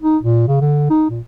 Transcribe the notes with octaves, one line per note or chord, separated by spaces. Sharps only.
D#4
A#2
C#3
D3
D#4
A#2